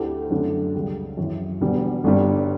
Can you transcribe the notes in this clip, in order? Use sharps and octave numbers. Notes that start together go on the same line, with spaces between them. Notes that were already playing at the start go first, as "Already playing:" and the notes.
Already playing: D2 D3 A3 E4 G4
F#2 D3 A3
C#2 C#3 G3
F#2 C#3 E3
E1 E2 D3 G3
G1 G2 D3 G3